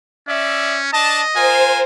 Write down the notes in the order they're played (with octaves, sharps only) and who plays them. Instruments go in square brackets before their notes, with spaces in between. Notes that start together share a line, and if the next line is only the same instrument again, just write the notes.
[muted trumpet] C#4 [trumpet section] D5 E5
[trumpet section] D4 A5 [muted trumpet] D#5
[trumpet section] F4 A#4 G#5 [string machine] C5